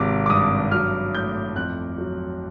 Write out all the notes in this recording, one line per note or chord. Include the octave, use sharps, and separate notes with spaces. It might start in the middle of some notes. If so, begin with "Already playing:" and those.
Already playing: G#1 C3 D6
D6
G2 D#6
F#3 F6
A2 G6
F2 F#6
F#3